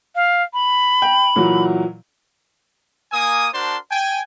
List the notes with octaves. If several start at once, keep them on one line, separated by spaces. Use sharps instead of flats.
F5
B5
G5
A#2 E3 F#3
A#3 G#5 D#6
D4 F#4 A#4 C5 A5 C6
G5 G#5